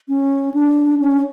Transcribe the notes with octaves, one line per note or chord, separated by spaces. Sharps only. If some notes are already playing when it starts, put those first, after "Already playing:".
C#4
D4
C#4